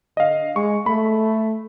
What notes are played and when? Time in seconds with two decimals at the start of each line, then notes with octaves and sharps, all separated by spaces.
0.17 D3 D#5 F5
0.56 G#3 C#6
0.86 A3 B5